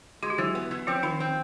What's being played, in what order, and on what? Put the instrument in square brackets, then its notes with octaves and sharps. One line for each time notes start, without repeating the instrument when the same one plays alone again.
[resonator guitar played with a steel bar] G#3 [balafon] F#4
[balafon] G4
[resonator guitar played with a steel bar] E3 [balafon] F#3 F#4
[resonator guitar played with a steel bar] B3
E3
[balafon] F3 F4 [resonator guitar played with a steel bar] C4
[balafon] D#3 D#4 [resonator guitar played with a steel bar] F4
[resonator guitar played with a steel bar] C4